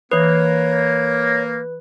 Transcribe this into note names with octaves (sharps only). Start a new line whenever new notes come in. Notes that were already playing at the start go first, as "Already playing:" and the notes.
E3 A#3 B4 C#5 D#6